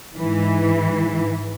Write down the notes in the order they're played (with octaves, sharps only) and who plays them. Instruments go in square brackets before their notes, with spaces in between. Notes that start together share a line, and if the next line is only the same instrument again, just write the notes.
[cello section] G#2 E3